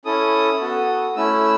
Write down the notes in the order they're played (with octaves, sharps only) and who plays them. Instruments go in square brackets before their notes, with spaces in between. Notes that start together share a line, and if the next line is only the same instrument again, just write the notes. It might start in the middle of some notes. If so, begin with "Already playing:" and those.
[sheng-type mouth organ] C#4 E4 A4 D#6
B3 F#4 A4
A3 C#4 E4 E6